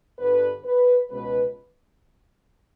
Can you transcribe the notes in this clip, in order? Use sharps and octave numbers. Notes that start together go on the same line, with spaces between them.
G1 G2 D3 B4
B4
C#2 B2 B4